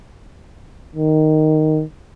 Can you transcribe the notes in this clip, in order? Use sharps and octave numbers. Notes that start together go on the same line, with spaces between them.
D#3